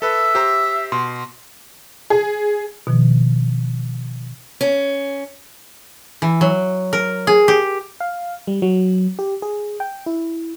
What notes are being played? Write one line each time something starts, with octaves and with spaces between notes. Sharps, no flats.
A4 B4 E5
G4 C5 A#5
B2 C6
G#4
B2 D#3 F3
C#4
E3
F#3
A#4
G#4
G4
F5
G3
F#3
G4
G#4
G5
E4